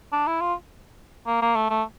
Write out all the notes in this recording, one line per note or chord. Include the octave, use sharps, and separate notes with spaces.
D4
E4
F4
A#3
A#3
A3
A3